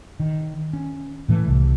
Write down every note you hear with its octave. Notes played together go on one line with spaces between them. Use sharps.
D#3
C#4
A2 E3 A3
C2 A3